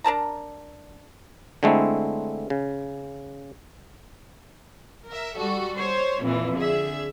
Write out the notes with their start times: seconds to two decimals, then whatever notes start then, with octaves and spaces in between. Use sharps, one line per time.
0.04 D4 A#4 A5 A#5
1.63 D3 G#3 A3 C4 E4
2.50 C#3
5.06 A#4 E5
5.36 G3 F#4 A4
5.77 C5 C#5
6.21 F2 A#2 E3
6.57 D3 G#4 E5